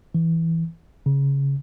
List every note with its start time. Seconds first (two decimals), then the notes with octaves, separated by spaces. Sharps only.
0.15 E3
1.06 C#3